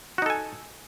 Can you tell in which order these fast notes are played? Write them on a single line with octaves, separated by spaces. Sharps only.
F#4 D#4 A4 G#5